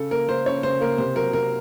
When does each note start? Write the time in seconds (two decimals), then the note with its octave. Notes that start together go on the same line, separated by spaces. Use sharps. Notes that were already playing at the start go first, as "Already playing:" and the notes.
Already playing: C#3 A4
0.11 A#3 A#4
0.28 A#3 C5
0.46 C#3 C#5
0.63 C#3 C5
0.81 A#3 A#4
0.98 C3 C5
1.16 F#3 A#4
1.33 C3 A#4